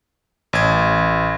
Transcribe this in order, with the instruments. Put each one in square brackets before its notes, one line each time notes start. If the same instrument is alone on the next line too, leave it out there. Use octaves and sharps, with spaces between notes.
[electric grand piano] A1 G#6